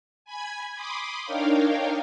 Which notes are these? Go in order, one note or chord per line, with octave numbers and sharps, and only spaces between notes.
G#5 B5 G#6
B5 C6 D6 D#6
D4 D#4 A#4 C#5 F5 G5